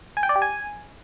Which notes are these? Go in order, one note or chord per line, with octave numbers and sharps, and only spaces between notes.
G#5
G5
D5
G4
G#5